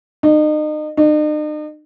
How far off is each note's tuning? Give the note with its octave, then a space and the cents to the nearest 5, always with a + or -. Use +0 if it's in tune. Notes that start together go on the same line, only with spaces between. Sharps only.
D#4 -35
D#4 -45